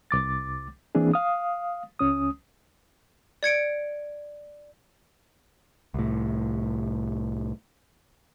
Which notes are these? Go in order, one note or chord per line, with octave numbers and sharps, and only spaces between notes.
C2 D6 A6
E3 A#3 C4 D4 G#4
F5 D#6
C#2 C#4 D#6
D5 G#6 C#7 D7
C2 A2